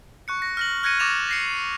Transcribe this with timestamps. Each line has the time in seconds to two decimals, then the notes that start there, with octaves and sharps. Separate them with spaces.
0.28 C#6 F#6 C#7
0.42 A#6
0.57 F6 A#6 F#7
0.83 F6 F#6 G#6 A#6 C#7 D#7
1.00 C#6 D6 A6 A#6 E7 F7
1.29 A#6 C7 C#7